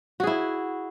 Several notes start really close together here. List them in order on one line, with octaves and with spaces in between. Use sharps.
F#4 G#4 E4